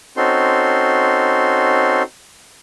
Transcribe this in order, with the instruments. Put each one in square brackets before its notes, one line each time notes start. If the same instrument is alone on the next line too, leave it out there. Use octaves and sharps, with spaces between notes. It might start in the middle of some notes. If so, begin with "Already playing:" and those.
[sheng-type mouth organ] C4 C#4 D#4 F#4 A4 C6